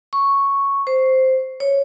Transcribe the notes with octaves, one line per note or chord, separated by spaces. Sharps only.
C#6
C5
C#5